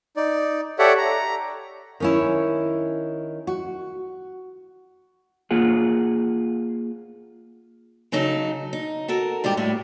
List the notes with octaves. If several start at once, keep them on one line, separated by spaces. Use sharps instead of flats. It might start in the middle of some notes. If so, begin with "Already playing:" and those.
D#4 D5
G4 A4 C#5 D5 E5 F#5
A#5
D#3 C#4 E4
F#4
A#3 F4 G#4 F#5
C#3 F#3 D#4 A4
D#4
F#4 A4 A#4
G#2 G3 F4 G4
A2 G3 A3